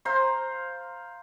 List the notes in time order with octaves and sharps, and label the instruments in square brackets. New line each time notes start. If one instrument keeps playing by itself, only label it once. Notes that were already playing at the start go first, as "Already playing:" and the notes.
[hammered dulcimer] C5 F5 A#5 C6